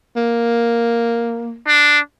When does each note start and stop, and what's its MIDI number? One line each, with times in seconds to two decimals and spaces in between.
0.16 1.58 58
1.67 1.99 62